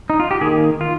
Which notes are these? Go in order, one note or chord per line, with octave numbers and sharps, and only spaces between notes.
D#4
F4
G4
D#3 A#3 G#4
F4